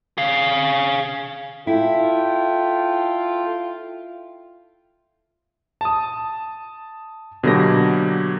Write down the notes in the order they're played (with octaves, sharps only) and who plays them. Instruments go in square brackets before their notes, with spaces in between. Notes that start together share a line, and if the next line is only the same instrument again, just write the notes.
[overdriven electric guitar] G#4 F5
[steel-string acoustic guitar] E4 [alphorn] F4 [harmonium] A4 G5
[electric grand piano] A5 D#6
B2 D3 F#3 A#3 G4 A#6